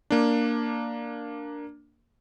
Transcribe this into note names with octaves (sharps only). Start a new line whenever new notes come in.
A#3 D4